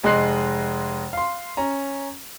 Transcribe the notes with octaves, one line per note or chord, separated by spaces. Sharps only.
F1 G#3 D#5 C6 F#6 C7
F5 C6
C#4 A#5